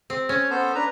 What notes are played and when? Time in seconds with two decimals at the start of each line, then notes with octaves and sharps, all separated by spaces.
0.10 C4
0.29 C#4 C#5
0.50 B3 A4 C5
0.75 D4 B4 A#5